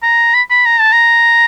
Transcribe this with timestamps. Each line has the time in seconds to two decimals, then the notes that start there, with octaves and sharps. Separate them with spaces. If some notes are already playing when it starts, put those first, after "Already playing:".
0.03 A#5
0.34 B5
0.50 B5
0.66 A#5
0.80 A5
0.92 A#5